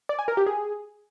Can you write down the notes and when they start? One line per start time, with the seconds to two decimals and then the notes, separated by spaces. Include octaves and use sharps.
0.09 D5
0.19 G#5
0.28 A#4
0.37 G4
0.47 G#4